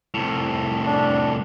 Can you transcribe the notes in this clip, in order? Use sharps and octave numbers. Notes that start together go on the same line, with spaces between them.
C2 A2
D4